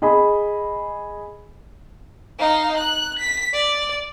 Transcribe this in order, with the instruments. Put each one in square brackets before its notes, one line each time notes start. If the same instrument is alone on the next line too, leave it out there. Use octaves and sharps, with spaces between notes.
[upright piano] G#4 D#5 G#5 B5
[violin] D#4 F5
F#6
B6
D5